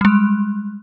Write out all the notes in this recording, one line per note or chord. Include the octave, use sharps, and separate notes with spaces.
G3 G#3